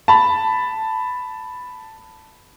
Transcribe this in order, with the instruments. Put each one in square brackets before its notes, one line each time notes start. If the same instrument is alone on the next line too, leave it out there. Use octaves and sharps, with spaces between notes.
[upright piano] A5 B5